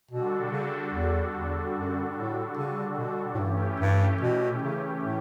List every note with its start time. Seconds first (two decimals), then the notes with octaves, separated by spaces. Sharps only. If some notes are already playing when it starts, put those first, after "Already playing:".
0.11 B2 D3 G3 D4 F#4 A4
0.53 C#3
0.93 E2
1.35 E2
1.75 F#2
2.17 A2
2.57 C#3
2.98 B2
3.35 A2
3.39 G2 E3 A3 C#4 G4
3.80 G2
4.21 B2
4.62 C#3
5.03 A2